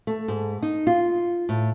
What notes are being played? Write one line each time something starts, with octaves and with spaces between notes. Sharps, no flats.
A3
G#2
D#4
F4
A2